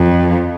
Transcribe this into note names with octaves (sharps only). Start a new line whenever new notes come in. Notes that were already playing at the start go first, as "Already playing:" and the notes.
Already playing: F2